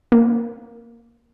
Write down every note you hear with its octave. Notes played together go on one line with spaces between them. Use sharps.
A#3